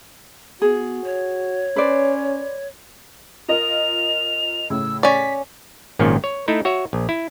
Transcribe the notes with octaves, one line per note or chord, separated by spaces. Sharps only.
B3 F#4 G#4
C#5
C#4 B4 C5 D5
F4 A#4 D#5 F7
A2 C#3 E6
C#4 D5 B6
G#1 A#2 D#3 F3 C#4
C#5
A3 D#4 E4
F#4 C#5 E5
A#1
E4